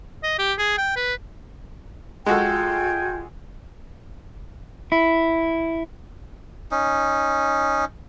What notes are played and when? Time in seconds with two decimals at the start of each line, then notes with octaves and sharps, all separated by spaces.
0.23 D#5
0.39 G4
0.58 G#4
0.78 G5
0.96 B4
2.26 G#3 F4 F#4 A4 G5 G#5
4.92 E4
6.71 C#4 D#4